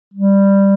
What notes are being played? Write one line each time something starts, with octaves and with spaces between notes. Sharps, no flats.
G3